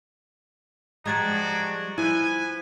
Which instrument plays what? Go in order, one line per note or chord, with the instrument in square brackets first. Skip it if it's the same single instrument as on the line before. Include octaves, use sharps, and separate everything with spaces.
[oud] F3 G3 G#3 [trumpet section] D4 F#4 [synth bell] A#5 G#6 A6
[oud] F3 [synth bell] E4 [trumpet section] B4 G#5